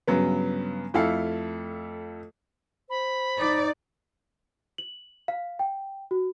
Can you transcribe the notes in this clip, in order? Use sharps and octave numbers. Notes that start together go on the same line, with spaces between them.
G2 C#3 F#3 B3
F2 A3 E4 A4 F5
C5 B5
D#4 D5
F#7
F5
G5
F#4